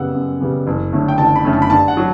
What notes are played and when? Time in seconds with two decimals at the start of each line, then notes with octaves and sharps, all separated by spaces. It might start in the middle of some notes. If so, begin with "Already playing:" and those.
Already playing: F#2 C#3 G3 B3 F#5 E6
0.14 F#2
0.40 C#3 G3 B3
0.67 F#1
0.93 F#2 D3 A3 C#4
1.08 G5
1.18 F#1 A5
1.36 B5
1.44 F#2 D3 A3 C#4
1.53 A5
1.62 B5
1.70 G2 A5
1.88 F#5
1.97 F#3